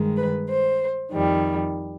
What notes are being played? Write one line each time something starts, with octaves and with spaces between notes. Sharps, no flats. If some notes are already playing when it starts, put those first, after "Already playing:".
Already playing: G2 D#3 G#3
B4
C5
F2 D#3 G3